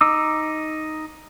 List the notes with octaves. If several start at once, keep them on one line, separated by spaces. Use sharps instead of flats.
D#4 D6 E6